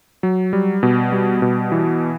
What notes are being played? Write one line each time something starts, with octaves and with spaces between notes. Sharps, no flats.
F#3
G3
B2
G3
B2
E3